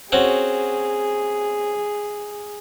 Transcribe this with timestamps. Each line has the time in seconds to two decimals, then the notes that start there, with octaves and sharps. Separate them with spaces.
0.12 C4 C#4 F#4 G#4